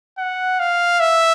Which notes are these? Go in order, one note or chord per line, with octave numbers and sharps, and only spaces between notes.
F#5
F5
E5